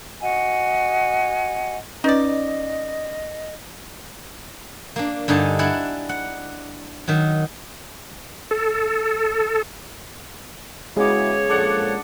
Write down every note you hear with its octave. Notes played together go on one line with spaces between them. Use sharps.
F#4 D#5 F#5 G#5
C#4 D#4 B4 D5 D#5 A6
A#3 D4
G2 D3 D#4 G#5 A5
D4 E4 D5 F#5 G#5
F#5
D#3 F#3
A4
C#3 G#3 B3 E4 F#4 G#4 C#5 D6
A#2 F3 D4 A4 D5 F#5